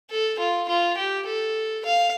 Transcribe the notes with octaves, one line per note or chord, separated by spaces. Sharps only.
A4
F4
F4
G4
A4
F5